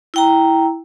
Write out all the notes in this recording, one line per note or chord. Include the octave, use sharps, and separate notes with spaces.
E4 G5 A#5